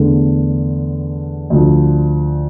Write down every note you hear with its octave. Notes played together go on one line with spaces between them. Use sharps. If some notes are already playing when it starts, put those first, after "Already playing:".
Already playing: E2 D3 A3
D2 D3 F3